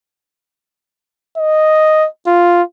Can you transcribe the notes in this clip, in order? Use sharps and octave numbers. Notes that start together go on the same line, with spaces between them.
D#5
F4